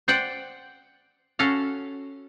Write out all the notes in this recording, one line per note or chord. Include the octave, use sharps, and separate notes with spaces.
C5 D5 F#5 G5
C#4 F#4 A4 F5